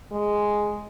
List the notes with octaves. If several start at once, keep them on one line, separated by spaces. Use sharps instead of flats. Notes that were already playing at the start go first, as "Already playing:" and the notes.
G#3